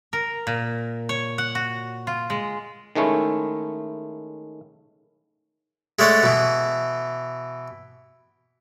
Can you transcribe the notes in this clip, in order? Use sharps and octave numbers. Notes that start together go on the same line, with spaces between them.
A#4
A#2
C#5
F#5
F#4
F4
G#3
D#3 G#3 A3 C#4 E4
G#3 A3 C#5 D5 F#5
B2 E3